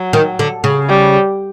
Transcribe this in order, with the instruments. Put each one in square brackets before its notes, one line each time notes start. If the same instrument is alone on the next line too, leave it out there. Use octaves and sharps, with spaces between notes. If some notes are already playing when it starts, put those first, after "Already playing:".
Already playing: [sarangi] F#3
[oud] D#3
D3
C#3
[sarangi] G3